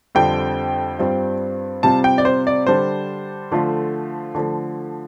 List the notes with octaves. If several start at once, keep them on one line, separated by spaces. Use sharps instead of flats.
F2 D3 G3 C4 F4 G5
G2 G3 C4 F4
C3 G3 C4 F4 A5
G5
D5
C5
D5
D3 G3 D4 C5
D3 F3 A3 F4
D3 F3 A3